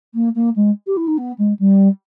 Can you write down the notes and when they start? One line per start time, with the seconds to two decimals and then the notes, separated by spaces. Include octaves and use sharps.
0.14 A#3
0.35 A#3
0.55 G#3
0.86 G4
0.96 E4
1.07 D#4
1.17 B3
1.38 G#3
1.59 G3